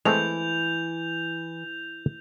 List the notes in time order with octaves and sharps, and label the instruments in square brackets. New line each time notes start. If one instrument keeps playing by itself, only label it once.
[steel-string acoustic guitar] E3 [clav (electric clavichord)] G#3 A3 C4 [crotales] G6 F7